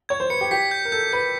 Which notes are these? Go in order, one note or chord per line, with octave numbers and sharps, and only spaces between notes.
C#5 G#6
C5
B4 C#7
G4
G4 B6
G6
A#4
A4 G6
B4 G6